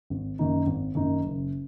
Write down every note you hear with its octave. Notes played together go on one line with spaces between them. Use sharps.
G#1
F#2 D#3 A#3 D#4
G#1
F#2 D#3 A#3 D#4
F#1